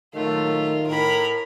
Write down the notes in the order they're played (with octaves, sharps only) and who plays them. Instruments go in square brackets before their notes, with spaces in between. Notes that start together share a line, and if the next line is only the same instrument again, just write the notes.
[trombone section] A#2 F#3 A3 [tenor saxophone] D#3 [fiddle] F4
[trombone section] A2 [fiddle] A#4 B5